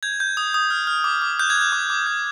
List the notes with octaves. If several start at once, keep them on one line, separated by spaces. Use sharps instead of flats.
G6 G#6
G6
D#6
D#6
F6
F6
D6
D6
F#6 G6
G#6
F#6 G6
D6
D6
G6